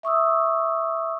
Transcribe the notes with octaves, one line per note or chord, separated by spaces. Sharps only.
E5 C#6 D#6 E6